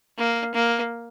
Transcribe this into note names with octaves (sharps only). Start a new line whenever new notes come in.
A#3
A#3